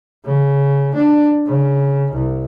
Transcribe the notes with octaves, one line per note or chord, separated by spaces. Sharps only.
C#3
D4
C#3
C2